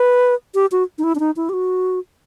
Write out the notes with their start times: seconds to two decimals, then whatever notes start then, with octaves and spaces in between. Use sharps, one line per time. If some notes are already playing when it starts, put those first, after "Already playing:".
Already playing: B4
0.55 G4
0.72 F#4
0.98 D#4
1.04 E4
1.15 D4
1.20 D#4
1.36 E4
1.49 G4
1.53 F#4